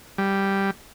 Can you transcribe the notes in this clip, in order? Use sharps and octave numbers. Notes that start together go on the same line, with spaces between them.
G3